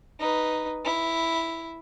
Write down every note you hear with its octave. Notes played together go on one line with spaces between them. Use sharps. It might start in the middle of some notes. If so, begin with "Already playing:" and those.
D#4 B4
E4